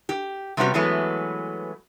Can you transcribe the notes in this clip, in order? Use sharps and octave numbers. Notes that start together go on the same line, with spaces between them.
G4
C3 G3 B3 C#4 F#4 G4
E3 F#3 G#3 A3 B3